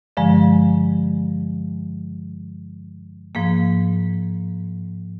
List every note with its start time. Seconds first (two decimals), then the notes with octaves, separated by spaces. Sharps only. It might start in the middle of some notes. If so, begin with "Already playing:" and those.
0.17 G2 D3 F3 G#3
3.35 G#2 F3 A#3